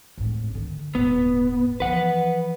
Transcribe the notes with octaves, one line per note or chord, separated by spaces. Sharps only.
G#1 A2
D3 D#3
D#1 G#2 B3
E3 F3 B4 F#5